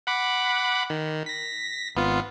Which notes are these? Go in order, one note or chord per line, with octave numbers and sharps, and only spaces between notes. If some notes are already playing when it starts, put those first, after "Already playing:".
F#5 B5 D6
D#3
A#6 B6
G#1 B3 F4